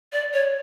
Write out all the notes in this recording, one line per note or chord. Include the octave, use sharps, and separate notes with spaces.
D5
C#5